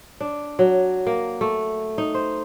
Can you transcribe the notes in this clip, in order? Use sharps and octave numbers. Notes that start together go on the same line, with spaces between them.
D4
F#3
A#3
A3
D#4
C5